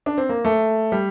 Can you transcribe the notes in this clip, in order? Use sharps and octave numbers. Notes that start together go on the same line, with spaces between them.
D4
C4
A#3
A3
G3